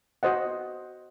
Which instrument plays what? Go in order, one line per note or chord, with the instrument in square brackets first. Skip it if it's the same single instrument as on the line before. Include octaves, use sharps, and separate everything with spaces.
[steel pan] F#4 C5 D#5 F#5